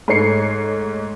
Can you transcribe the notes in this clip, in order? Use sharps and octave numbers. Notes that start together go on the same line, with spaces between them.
G#2 A3 C#5 C7 C#7